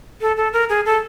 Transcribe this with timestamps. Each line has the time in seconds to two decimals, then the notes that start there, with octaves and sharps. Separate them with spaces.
0.21 A4
0.37 A4
0.53 A#4
0.69 G#4
0.86 A4